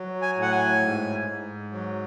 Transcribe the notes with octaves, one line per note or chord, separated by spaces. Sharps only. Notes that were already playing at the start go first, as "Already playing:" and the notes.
Already playing: F#3
G#5
A2
F#5
G#5
G#2
G#2
F#3